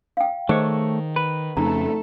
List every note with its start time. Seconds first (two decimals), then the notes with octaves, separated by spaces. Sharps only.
0.17 F5 G5
0.49 D#3 A3 G#4 C5 C#5 D#5
1.16 B4
1.57 F2 C#3 A3 D#4 A4 A#5